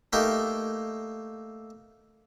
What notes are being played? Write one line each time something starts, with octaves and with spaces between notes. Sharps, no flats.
A3 A#3 D#4 G4 C6